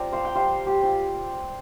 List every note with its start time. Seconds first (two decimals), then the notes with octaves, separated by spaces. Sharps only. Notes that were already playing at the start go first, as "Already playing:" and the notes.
Already playing: C4 F4 D5 A#5
0.13 C5 F5
0.25 G5
0.35 G3 C5 F5
0.67 G4
0.82 C4 F4